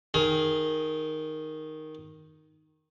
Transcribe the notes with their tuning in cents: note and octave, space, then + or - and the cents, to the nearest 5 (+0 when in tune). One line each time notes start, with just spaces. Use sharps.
D#3 +0 G#4 +0 D#6 +30